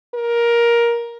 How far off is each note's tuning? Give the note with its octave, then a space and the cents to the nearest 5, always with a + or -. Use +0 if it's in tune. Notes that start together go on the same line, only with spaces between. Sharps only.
A#4 +15